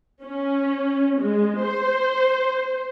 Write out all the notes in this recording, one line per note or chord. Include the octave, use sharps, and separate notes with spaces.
C#4
G#3
C5